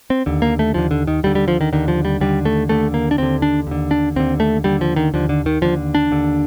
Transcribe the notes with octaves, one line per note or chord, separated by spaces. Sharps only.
C4
D#2 D3
A#3
A3
D#2 D3 F3
D3
D#3
D#2 D3 G3
G3
F3
D#3
D#2 D3 D#3
F3
G3
D#2 D3 G3
A3
D#2 D3 A3
A#3
D4
D#2 D3 C4
D4
D#2 D3
D4
D#2 D3 C4
A3
D#2 D3 G3
F3
D#3
D#2 D3 F3
D3
D#3
D#2 D3 F3
D4
D#2 D3